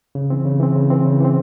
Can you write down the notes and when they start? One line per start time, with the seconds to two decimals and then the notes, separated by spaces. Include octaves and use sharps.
0.15 C#3
0.30 E3 C4
0.45 C#3
0.60 E3 C4
0.76 C#3
0.90 E3 C4
1.05 C#3
1.20 E3 C4